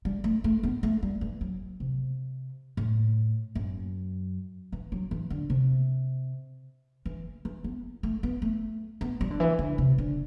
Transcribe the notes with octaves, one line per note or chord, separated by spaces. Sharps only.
G3
A3
A3
B3
A3
G3
E3
F#3
C3
A2
F#2
E3
F#3
E3
D3
C3
E3
E3
B3
A3
B3
A3
B3
G3
D3
E3
D3
C3
D3